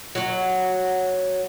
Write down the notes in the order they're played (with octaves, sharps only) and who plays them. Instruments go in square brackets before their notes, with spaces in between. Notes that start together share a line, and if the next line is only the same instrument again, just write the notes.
[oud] F#3 F#4